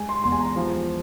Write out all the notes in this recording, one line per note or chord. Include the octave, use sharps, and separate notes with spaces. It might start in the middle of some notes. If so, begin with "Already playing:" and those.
Already playing: G#3 G#5
C6
E2 C6
G#5
A#5
F3